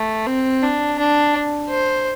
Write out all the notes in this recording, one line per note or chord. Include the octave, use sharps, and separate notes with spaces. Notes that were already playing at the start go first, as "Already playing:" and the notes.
Already playing: A3
C4
D4
D4
C5